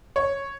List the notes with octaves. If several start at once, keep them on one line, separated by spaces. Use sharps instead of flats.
C#5